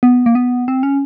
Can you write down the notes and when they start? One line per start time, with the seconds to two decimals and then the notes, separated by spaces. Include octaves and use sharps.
0.03 B3
0.26 A#3
0.35 B3
0.68 C4
0.83 C#4